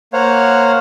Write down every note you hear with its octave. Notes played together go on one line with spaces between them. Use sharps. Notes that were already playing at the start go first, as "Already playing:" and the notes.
A#3 C5 C#5 F5 F#5